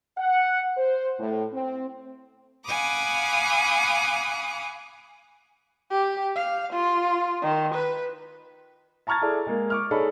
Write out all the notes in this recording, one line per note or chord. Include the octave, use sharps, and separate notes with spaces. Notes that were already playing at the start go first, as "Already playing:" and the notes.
F#5
C5
A2
C4
F5 F#5 G#5 B5 D6 D#6
G4
F5
F4
D#3
B4
A5 A#5 C#6 F6 G#6 A6
E4 G#4 A4 D5 A5
G#3 A#3
C#6 D6 F6
D#4 G#4 A4 C#5 D5 B5